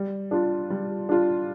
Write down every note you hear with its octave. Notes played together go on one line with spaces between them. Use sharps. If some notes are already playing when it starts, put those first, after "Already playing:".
Already playing: G3
D4 F4
G3
D4 F4